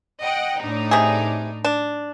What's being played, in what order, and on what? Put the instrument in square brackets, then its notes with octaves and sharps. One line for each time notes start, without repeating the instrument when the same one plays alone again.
[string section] D#5 F#5 G5
A2 D4 D#4
[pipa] C3 G#4
D4